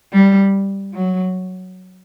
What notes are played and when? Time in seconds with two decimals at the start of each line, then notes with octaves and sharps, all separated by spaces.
0.13 G3
0.94 F#3